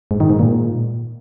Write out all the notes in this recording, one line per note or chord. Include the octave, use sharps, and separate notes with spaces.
G#2
D#3
G#2
A#2